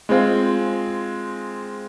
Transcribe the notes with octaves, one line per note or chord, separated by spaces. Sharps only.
G#3 C4 F4